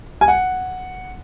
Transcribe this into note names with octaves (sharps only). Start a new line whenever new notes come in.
G#5
F#5